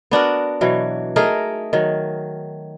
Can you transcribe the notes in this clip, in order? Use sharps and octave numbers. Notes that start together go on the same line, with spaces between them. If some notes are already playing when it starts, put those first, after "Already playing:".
B3 D4 F#4 A#4
B2 E3 F#3
A3 D#4 G#4 A#4
D#3 F#3